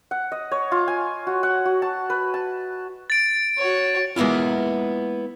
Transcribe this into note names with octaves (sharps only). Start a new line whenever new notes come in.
F#5
D#5
C#5
F4
G#5
F#4
F#5
F#4
A5
B4
A5
A6 D7
F#4 C#5
G#3 A#3 B3 E4 F4